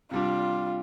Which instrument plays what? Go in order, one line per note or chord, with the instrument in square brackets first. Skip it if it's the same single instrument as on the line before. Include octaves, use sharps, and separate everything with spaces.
[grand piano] C3 G3 D4 [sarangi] F4